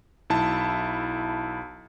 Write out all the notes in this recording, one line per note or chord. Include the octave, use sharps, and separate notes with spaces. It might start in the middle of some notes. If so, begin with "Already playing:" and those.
B1 E4 A5